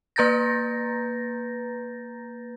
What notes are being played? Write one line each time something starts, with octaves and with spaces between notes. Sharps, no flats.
A#3 B4 A#5 G6 A6 A#6